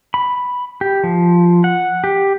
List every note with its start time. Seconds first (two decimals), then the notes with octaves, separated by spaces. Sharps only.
0.14 B5
0.81 G4
1.04 F3
1.64 F#5
2.04 G4